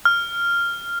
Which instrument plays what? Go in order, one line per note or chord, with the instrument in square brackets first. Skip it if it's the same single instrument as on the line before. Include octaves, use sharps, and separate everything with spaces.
[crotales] F6